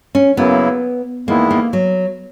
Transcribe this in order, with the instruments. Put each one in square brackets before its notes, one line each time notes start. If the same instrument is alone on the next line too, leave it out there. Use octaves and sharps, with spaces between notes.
[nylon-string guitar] C#4
[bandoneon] F#2 C#3 F#3 A#3 E4 [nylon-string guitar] B3
[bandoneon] E2 D#3 G#3 B3 E4 [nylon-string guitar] A#3
[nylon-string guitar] A#3
F#3